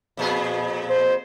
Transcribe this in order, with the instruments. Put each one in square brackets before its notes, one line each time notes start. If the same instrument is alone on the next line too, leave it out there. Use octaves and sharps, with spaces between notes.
[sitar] F2 A#2 G#4
[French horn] C5